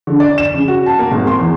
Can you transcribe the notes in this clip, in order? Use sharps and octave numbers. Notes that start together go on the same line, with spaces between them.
D3
D5
E7
C#3
F#4
A5
A#3
G#1
C6
E2